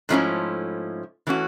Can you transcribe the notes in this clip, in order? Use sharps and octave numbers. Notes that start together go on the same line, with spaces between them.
G#2 F3 A3 C#4 E4
E3 A3 C#4 F#4